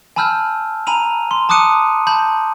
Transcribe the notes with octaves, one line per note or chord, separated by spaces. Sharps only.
G#5 A5 B5 E6 F6 G6
G#5 A#5 B5 D#7 F7
C6
A5 D6 D#6 F#6 C#7 D#7
A5 B5 G6